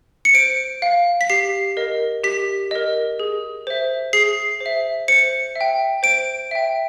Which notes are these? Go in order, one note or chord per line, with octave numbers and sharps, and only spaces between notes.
C#7
C5 D7
F5
B6
G4 C7
A#4 D#5
G4 B6
A#4 D#5
G#4
C5 E5
G#4 C7
C5
E5
C5 C#7
E5
G5
C5 D7
E5 G5